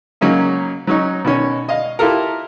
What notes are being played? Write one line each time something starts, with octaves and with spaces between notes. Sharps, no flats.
C#3 F#3 A#3 C#4 D#4
F#3 C#4 D#4
B2 D#3 C#4
D#5 F5
E4 F4 G4 A4 A#4